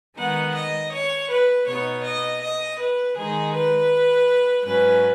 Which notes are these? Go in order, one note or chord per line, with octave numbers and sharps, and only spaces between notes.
D#3 G#3 B3 D#4 F#5
D#5
C#5
B4
B2 B3 D#4 C#5
D#5
D#5
B4
D#3 G#3 D#4 G#4
B4
G#2 F#3 C#4 B4